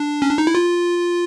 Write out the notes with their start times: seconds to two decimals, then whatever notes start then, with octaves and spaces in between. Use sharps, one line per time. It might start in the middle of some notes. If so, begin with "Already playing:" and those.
Already playing: D4
0.22 C#4
0.30 D4
0.38 D#4
0.47 E4
0.55 F4